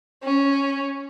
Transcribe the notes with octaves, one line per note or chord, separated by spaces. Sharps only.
C#4